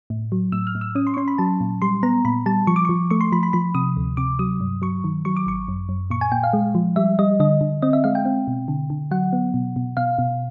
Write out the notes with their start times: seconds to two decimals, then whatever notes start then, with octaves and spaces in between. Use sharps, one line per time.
0.10 A2
0.32 F#3
0.52 A2 E6
0.67 F6
0.75 A2
0.81 E6
0.95 C#4 D#6
1.07 C6
1.14 C#6
1.17 C#4 C6
1.28 B5
1.38 F#3 A5
1.61 A#2
1.82 G3 C6
2.03 B3 A#5
2.25 A#2 B5
2.46 G3 A5
2.67 F3 C#6
2.76 D6
2.85 F3 C#6
3.10 A3 C#6
3.21 C6
3.32 F3 B5
3.43 B5
3.53 F3 B5
3.75 C3 D#6
3.97 D2
4.17 C3 D6
4.39 F#3 D#6
4.60 G2
4.82 F#3 C#6
5.04 D#3
5.25 F#3 C#6
5.37 D6
5.47 G#1 C#6
5.68 F#2
5.89 F#2
6.10 A#2 C#6
6.21 G#5
6.32 A#2 G5
6.43 F5
6.53 G#3
6.75 F3
6.96 G3 E5
7.19 G3 D#5
7.40 D3 D#5
7.61 D3
7.82 C4 D#5
7.93 E5
8.04 G#3 F5
8.15 G5
8.25 C4
8.48 B2
8.68 D3
8.90 D3
9.11 F#3 F#5
9.33 B3
9.54 B2
9.76 B2
9.97 B2 F5
10.19 B2